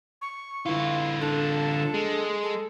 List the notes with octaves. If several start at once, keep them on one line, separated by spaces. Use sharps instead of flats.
C#6
D3 E4 F4
D4 A4
G#3
A4